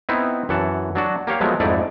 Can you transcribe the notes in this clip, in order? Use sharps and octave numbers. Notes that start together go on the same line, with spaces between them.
B3 C4 D#4 E4
F#2 E3 F#5 A5
F#3 D4 F#4
A#3 G4 C#5 F5
F3 F#3 G#3 A3 B3 A#4
F2 G#2 A3 D#4 E4 D5